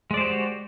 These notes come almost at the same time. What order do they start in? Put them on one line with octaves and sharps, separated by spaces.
G#3 D5 C5 G4 F#4